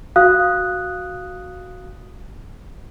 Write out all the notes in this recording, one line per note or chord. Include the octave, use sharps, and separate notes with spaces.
F#4 F5 D#6 F#6